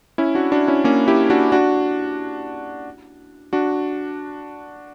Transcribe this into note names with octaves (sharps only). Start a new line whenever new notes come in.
C#4 E4
D4 F#4
D4 F#4
C#4 E4
A#3 C#4
E4 G4
D4 F#4
D4 F#4
D4 F#4